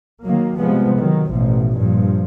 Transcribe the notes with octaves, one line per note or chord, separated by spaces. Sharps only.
D#3 F#3 A#3
C3 F3 G3 G#3 B3
D#3 F#3
A1 B2 F3
G2 A#2 F3